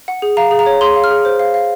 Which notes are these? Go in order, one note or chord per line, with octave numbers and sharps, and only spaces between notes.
F#5
G#4
F5 A#5
G#4
A#5
C#5
G#4 C6
F5
F6
G#4
C5
F5
F5